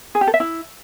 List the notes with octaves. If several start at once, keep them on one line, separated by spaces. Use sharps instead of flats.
G#4
G4
A4
E5
E4